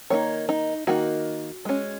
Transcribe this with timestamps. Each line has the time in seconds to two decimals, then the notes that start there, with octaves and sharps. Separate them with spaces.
0.10 D#3 A#3 D#4 C#5
0.49 D#4
0.87 D#3 A#3 D#4 F#4
1.65 G#3 C#4